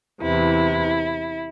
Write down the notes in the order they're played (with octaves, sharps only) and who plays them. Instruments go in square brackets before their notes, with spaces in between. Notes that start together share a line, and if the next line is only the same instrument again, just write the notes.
[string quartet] E2 C3 E3 E4